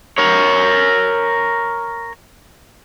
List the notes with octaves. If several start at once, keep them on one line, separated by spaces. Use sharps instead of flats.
A#4 C#5